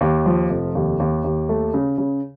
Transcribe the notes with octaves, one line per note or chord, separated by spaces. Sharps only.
D#2
F3
F1
D#2
D#2
D#2
A3
C#3
C#3